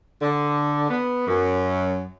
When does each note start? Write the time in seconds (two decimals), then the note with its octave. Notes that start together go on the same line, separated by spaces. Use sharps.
0.22 D3
0.90 B3
1.27 F#2